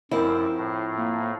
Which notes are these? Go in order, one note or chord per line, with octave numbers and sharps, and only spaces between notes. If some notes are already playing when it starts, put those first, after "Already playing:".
F#2 F3 C4 E4 A#4
A2
A#3